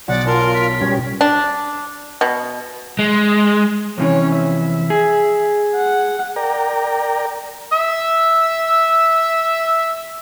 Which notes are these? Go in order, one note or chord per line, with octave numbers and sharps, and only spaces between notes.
B1 D5 F#5
F4 A#4 A5 C6
B6
B2 G3 C#4 G#6
D4
B2
G#3
F2 C3 E3 C#4 C#5
E5
G#4
F#5
A#4 D5 G5 A#5
E5 E6